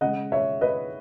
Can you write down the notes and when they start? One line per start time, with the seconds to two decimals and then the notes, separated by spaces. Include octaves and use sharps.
0.01 C#3 G#3 D#5 F#5
0.32 C#5 E5
0.61 B4 D#5